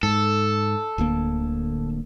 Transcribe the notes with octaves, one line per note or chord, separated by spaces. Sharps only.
G#2 A4
D1 D2 A#3